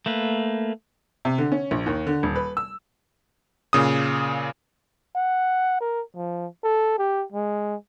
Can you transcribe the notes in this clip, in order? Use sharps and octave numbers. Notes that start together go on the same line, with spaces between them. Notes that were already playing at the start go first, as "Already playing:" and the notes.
A3 A#3 B4
C3
D3
C#4
A#1
D#2
D3
D#1
B4
E6
A#2 C#3 D#6
F#5
A#4
F3
A4
G4
G#3